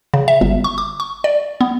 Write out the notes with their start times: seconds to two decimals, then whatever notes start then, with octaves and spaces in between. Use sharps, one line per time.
0.14 C#3
0.28 E5
0.41 G1
0.64 C#6
0.78 D6
1.00 C#6
1.24 D5
1.61 B3